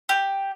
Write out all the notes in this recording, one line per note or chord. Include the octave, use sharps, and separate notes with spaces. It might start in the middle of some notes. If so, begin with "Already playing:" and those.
G4